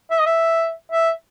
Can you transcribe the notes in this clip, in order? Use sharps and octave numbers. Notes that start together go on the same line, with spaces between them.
E5
D#5
E5
E5